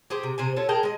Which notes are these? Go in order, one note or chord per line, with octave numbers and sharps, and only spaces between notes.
G4 G#4 C5
C3
C3 C5 G#5
C#4 F4 A4
G#4 A#4 G5 A5
G#3 D#5